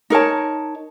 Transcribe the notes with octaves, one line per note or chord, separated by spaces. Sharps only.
D#4 A#4 C#5 A5